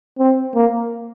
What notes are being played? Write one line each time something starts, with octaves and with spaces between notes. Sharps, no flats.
C4
A#3